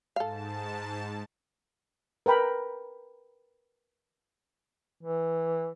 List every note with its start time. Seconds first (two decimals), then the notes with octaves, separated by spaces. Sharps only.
0.16 G#2 A4 F5 A5
2.26 A#4 B4 G5 B5
5.03 E3